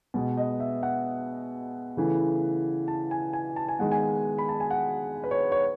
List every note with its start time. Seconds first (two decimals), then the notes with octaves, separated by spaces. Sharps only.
0.14 B2 G#3 B3
0.37 D#5
0.60 E5
0.83 F#5
1.97 C#3 E3 A3
2.88 A5
3.11 G#5
3.33 G#5
3.56 A5
3.69 G#5
3.79 D#3 G#3 B3 F#5
3.92 G#5
4.38 B5
4.49 A5
4.60 G#5
4.71 F#5
5.24 B4
5.31 C#5
5.52 C#5